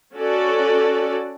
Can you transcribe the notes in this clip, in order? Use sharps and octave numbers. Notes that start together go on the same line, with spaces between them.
C#4 F#4 A4 D5